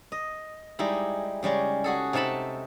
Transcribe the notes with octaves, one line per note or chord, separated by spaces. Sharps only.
D#5
G3 G#3 D#4 E4
C#3 G3 G#3 C#4
F#4 G#4 A4
C3 D#4 A4 A5 B5